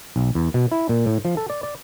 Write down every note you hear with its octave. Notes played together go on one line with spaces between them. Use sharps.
B1
E2
B2
E4
A#2
A2
F3
A4
D5
D5